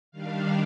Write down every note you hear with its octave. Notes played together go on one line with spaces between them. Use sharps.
D#3 G3 D4 F5